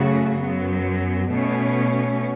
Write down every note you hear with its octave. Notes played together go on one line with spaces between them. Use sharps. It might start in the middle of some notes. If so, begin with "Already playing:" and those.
Already playing: F#2 C#3 A3 C#4 F#4
F#2 F#3 B3
B2 A3 C#4